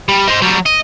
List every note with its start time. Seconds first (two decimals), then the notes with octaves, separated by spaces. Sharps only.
0.09 G3
0.27 D#4 C5
0.42 F#3 G3
0.66 D#5